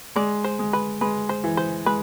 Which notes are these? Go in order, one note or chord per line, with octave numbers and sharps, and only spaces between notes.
G#3 D5
C5
G#3
B4
G#3 B4
C5
E3
C5
G#3 B4